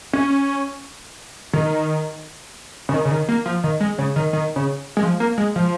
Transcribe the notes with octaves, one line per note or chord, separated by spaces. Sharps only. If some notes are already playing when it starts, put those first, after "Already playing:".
C#4
D#3
C#3
D#3
C#3
D#3
A#3
F3
D#3
G#3
C#3
D#3
D#3
C#3
G#3
F3
A#3
G#3
F3